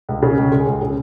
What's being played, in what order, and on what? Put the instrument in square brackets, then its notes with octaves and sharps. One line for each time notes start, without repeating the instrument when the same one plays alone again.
[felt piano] C#2
C#3
C#2
G#3
C#2
C#3